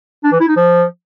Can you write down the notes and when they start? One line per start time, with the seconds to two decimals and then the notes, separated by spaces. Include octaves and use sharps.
0.24 D4
0.32 E3
0.40 E4
0.48 D#4
0.56 F3